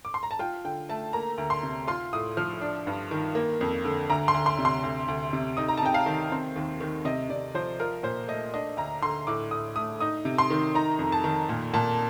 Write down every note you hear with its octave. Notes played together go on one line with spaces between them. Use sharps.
D6
C6
A#5
A5
F4 G5
D3 G5
A3 A5
A#3 A#5
D2
C6
C3
F4 C6
A2 D#6
F3 F6
D4
G2
D#3
A#3
F2
D3
D2 A#5
C6
D2
C6
C3
C6
D2
D2
C3
D#4 D#6
A#5
A5
C3 G5
F5
D#3
C4
D#2
D#3
C3 D#5
C3 D5
F3 C5
F4 A#4
A#2 C5
A3 D#5
D4 D#5
D2 A#5
D3 C6
A2 D6
A2 D#6
A3 D#6
D#4 D#6
C3
C6
D#3
D#4 A#5
F2
A5
D#3
A#2
A#2 A5